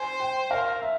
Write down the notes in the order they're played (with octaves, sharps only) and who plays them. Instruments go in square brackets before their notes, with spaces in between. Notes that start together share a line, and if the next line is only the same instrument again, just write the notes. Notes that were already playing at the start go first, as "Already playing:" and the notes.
Already playing: [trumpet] C5 [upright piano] G#5
[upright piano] G5
[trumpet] A#4 [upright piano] F5
[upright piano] E5